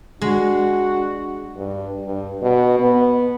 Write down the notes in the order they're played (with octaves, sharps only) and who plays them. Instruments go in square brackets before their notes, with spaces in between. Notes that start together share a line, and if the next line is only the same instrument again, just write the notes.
[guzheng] G#3 [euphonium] D4 [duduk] F#4
[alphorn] G2
G2
B2
B3